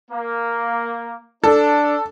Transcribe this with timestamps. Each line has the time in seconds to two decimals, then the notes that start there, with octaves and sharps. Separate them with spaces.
0.11 A#3
1.44 D4 A4